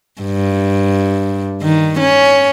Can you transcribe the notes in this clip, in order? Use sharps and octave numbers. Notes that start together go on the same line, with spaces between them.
G2
D#3
C#4